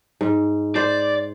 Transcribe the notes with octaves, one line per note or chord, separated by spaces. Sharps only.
G#2
C5 D5